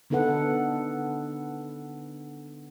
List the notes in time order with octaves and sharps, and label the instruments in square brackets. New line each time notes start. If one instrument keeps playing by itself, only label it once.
[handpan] D3 B3 D#4 A4 B4 F#5